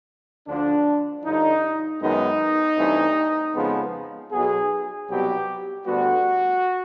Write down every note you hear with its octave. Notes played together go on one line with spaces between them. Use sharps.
D2 D3 F3 D4
G2 D3 F3 D#4
F#2 D#3 G#3 B3 D#4
G2 E3 A3 C4
F2 C#3 F3 G#3 B3
B1 B2 F#3 B3 G#4
C2 B2 F#3 B3 G4
D2 D3 G3 B3 F#4